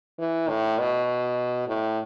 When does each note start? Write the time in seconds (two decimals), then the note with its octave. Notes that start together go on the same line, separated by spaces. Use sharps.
0.19 E3
0.49 A2
0.79 B2
1.68 A2